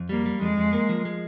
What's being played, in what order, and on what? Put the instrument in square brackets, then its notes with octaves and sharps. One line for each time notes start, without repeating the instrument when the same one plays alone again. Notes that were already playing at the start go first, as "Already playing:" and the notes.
Already playing: [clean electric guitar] F2
[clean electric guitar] G3 [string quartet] A#3
[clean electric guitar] G3
[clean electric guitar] F2 [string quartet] G#3
[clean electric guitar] F2
A#3
F3
G#3